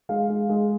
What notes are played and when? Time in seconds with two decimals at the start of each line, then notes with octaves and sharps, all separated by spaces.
0.09 G#3 F5
0.30 G#3
0.49 G#3